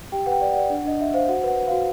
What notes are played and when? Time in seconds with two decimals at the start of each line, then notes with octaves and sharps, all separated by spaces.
0.12 G4 G5
0.26 B4 F#5
0.32 G5
0.41 D5
0.52 D5 F#5
0.70 D4
0.85 D4 D#5
0.99 D4 E5
1.14 C5 F5
1.29 F#4 F#5
1.43 B4
1.48 F#5
1.57 B4
1.67 F#4 F5